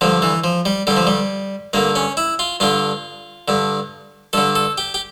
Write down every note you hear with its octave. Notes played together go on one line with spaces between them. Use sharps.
G2 D3 F3
E3
F3
G3
G2 D3 G3
F3
G3
G2 D3 A#3
C#4
E4
F4
G2 D3 F4
G2 D3
G2 D3 A4
A4
G4
G4